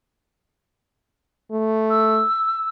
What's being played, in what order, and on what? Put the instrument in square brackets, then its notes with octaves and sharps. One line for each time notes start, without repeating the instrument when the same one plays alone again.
[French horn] A3
[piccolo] E6